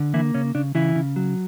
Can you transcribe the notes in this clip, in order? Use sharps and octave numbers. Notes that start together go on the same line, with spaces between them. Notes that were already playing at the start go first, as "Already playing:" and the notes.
Already playing: D3
E3 A#3 E4
C#3 C#4
C#3 D4
C#3 E3 E4
C#3
F#3